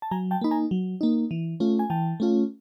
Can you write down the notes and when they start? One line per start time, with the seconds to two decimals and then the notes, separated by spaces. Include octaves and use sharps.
0.02 A5
0.11 F#3 G#5 A#5
0.31 G5 A5
0.41 A#3 D#4 B5
0.51 G#5 A#5
0.71 F#3
1.01 A#3 D#4
1.31 E3
1.60 A3 C#4 F4
1.79 G#5
1.90 E3 G5 A5
2.20 A3 C#4 F4